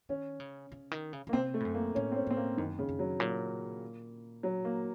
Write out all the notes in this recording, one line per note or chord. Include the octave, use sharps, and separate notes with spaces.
D#3 C#4
C#3
C#3
D#3
C#3
C#3 A#3
C3 C4
A3
A2
F#2
A#3
A2 C#4
C4
C#4
A2 C4
A#3
F#2 D#3
C#3
F#2
F#3
A#2 F#3
F#3
A#3